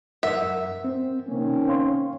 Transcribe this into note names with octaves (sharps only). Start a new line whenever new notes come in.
F#2 A#4 E5 F#5
C4
C3 D#3 A#3 C4 C#4
C#5 F5 C6